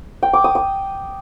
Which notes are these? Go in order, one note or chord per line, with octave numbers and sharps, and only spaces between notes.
G5
D6
D#6
D#6